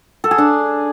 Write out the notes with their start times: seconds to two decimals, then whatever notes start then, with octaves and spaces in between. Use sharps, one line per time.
0.24 A4
0.31 G#4
0.38 D4